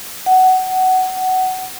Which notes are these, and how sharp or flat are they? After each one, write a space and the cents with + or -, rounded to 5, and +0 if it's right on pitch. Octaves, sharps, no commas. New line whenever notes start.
F#5 +15